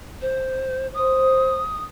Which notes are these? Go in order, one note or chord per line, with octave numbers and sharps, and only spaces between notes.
C5
C5 D#6